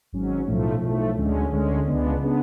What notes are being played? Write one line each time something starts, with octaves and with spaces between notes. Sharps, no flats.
G#1 G#2 F#3 C#4
B1 A2 F3 A3
B1 A2 F3 A3
D2 D3 G#3 C#4
D2 D3 G#3 C#4
C#2 C#3 G#3 B3 D4
C#3 G#3 B3 D4